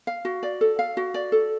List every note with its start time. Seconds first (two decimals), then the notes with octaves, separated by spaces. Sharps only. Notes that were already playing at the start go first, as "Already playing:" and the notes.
0.07 F5
0.25 F#4
0.43 D5
0.61 A4
0.79 F5
0.97 F#4
1.14 D5
1.32 A4